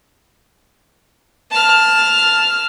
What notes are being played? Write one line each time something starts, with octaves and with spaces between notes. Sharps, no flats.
A5 F6